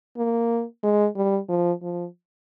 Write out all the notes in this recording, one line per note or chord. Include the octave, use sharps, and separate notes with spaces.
A#3
G#3
G3
F3
F3